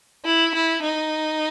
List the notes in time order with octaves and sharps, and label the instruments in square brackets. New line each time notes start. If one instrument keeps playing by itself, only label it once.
[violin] E4
E4
D#4